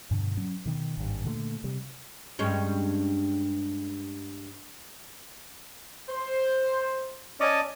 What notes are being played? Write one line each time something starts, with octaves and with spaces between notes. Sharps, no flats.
G2 B2 D3
F#3 C#4
B2 D#3
G#1 G2
A#2 D3 F#3 A3
C3 G3
G2 G#3 C#4
C5
C#4 D5 D#5 A5